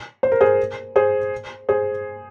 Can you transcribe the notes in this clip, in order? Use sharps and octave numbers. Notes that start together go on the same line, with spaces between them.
C5
A#4
G#4 C5
G#4 C5
G#4 C5